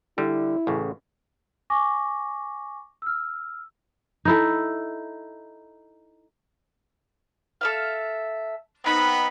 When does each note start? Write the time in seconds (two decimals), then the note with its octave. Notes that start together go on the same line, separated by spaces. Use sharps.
0.18 D3 G3 E4
0.67 A1 C#3
1.70 G#5 C#6 D6 A#6
3.02 E6 F6
4.25 D#4 E4 A4
7.61 A4 E5 F5
8.84 B3 C4 D#4 F#5 B5